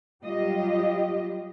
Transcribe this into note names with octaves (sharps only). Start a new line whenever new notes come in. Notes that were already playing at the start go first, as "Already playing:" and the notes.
F#3 G3 F4 G4 D#5